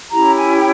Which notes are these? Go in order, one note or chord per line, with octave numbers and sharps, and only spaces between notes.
C#4 E4 G4 A#5
G#5
G5